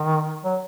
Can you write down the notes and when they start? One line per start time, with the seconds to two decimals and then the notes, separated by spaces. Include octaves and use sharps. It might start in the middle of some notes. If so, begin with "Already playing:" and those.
Already playing: D#3
0.44 F#3